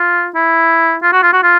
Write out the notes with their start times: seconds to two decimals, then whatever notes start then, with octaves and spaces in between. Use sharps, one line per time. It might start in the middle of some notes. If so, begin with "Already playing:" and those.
Already playing: F4
0.35 E4
1.03 F4
1.13 F#4
1.23 F4
1.33 F#4
1.43 F4